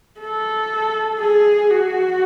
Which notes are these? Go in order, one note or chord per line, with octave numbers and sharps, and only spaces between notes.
A4
G#4
F#4